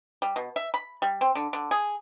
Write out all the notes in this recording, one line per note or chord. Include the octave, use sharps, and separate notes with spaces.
G3
B2
E5
B5
G3
C4
D3
D3
G#4